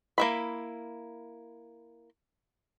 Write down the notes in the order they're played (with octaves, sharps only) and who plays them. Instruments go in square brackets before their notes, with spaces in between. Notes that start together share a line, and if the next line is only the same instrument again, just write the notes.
[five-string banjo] A#3 E4 B5